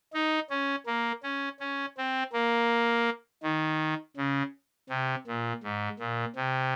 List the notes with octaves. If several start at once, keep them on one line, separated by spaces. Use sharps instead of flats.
D#4
C#4
A#3
C#4
C#4
C4
A#3
D#3
C#3
C3
A#2
G#2
A#2
C3